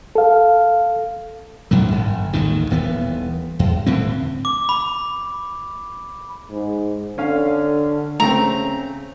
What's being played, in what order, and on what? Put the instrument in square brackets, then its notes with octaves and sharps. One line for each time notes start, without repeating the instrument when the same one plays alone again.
[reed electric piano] A4 F5
[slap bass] A1 G#2 D#3 F#3
G1
A1 D#2 G#2 D#3
D#1 E3 B3
E2
D#1 A2 D3 C4
[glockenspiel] D6
B5
[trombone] G#2
[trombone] D3 [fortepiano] C#4 F5
[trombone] C#3 [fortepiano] A3 C4 [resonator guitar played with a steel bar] A#5